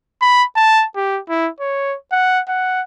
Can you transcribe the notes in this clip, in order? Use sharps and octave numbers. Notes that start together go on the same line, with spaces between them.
B5
A5
G4
E4
C#5
F#5
F#5